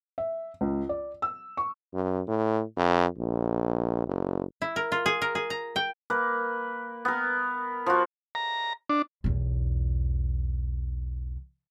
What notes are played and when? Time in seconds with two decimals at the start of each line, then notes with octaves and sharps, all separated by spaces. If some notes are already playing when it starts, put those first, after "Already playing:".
0.18 E5
0.61 C#2
0.89 D5
1.22 E6
1.57 C#6
1.94 F#2
2.27 A2
2.77 F2
3.18 A#1
4.07 F#1
4.62 E4
4.76 A#4
4.92 F4
5.06 G#4
5.22 A#4
5.35 G#4
5.50 A#5
5.76 G5
6.10 A#3 B4
7.05 B3 A#4
7.86 F3 F#4
8.35 A#5
8.89 D4
9.24 B1 E2